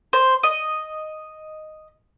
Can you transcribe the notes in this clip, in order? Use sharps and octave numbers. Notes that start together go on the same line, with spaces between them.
C5
D#5